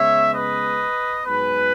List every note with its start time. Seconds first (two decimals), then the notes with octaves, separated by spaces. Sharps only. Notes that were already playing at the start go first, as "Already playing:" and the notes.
Already playing: C#3 G#3 B3 C#5 E5
0.33 B4 D#5
1.25 G#2 F#3 B3 G#4 B4